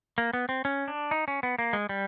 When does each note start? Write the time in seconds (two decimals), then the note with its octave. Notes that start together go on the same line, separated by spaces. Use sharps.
0.18 A#3
0.33 B3
0.49 C4
0.65 C#4
0.88 D4
1.11 D#4
1.28 C#4
1.43 B3
1.59 A#3
1.73 G#3
1.89 G3